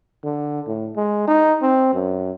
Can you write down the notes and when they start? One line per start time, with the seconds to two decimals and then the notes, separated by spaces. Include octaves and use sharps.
0.24 D3
0.67 A2
0.96 G#3
1.28 D#4
1.62 C4
1.94 F#2